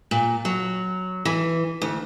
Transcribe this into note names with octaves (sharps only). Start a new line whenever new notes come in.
A#2
F#3
E3
D2